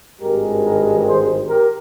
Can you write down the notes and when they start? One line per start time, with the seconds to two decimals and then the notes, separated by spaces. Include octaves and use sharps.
0.21 G#1 G2 D#3 G#3 G4 A#4
0.63 G4 A#4
1.05 G#4 C5
1.47 G4 A#4